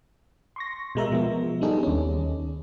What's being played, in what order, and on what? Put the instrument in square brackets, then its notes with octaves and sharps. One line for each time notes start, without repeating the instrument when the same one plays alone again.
[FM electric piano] C6 C#6 A#6
B2 G#3 A#4 E5
F3 B3
G3 B3 D4 D#4 G#4 A4
D#2 C#4